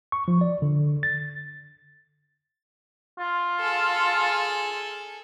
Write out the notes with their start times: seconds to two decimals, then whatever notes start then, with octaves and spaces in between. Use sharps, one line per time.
0.12 C#6
0.28 F3
0.41 D5
0.62 D3
1.03 A6
3.19 F4
3.61 G#4 A4